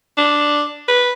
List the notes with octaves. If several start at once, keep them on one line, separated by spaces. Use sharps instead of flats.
D4
B4